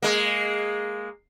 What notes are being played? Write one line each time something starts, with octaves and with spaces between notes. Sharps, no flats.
G#3 A#3